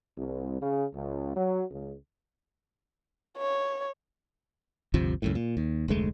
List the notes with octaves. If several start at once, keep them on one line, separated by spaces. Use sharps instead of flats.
C2
C#3
C#2
F#3
C#2
C#5
G1 D2 C3 F3
C#2 F#2 A2
A#2
D#2
F1 D2 G#3 A3